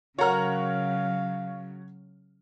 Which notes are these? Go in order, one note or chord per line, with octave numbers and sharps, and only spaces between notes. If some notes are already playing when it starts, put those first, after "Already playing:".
C#3 F#3 F#4 A#4 C#5 F5 F#5 F6